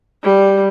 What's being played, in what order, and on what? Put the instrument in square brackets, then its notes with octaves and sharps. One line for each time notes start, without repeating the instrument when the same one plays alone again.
[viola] G3